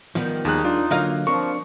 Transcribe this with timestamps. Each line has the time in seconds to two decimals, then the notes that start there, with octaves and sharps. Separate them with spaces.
0.15 D#3 F3 G3 B3
0.45 D#2 D#4 G#4 F#6
0.65 D4 F4
0.90 D3 F#3 A#3 D#5 F5
1.27 F3 C4 D4 A#4 C#6